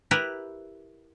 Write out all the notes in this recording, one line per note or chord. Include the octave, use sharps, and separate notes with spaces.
E4 G4 A#4 B4